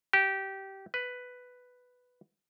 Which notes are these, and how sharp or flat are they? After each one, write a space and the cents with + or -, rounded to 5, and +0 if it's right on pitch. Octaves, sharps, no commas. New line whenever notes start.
G4 -20
B4 +5